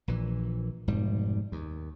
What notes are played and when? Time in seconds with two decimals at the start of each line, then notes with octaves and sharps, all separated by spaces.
0.08 A#1 A#2 E3
0.87 F1 G#2 B2 G3
1.52 D#2